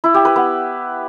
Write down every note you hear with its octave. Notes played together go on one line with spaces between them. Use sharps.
E4
G4
B4
B3